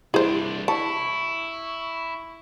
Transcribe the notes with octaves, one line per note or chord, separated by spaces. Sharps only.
C2 D4 E4 G#4 C5
E4 A5 C#6